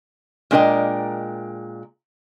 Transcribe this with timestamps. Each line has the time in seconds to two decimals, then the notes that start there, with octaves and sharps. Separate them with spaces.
0.51 A#2 G#3 D4 A#4 D#5 G5